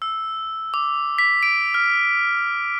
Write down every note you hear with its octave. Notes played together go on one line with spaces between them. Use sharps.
E6
D6
B6
D7
F6